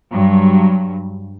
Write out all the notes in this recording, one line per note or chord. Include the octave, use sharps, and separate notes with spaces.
G2 F#3